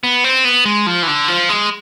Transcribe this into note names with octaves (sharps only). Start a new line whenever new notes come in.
B3
C4
B3
G#3
F3
E3
D3
F3
G#3